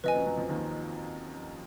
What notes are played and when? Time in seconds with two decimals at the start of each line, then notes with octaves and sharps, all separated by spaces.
0.04 F2 F3 B4 D#5 G#5
0.15 F#2 F#3
0.26 F#2 F#3
0.37 F2 F3
0.49 D#2 D#3